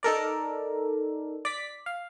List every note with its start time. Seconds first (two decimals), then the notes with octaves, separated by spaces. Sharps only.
0.03 D#4 A4 A#4 D5
1.45 D5 B6
1.86 F5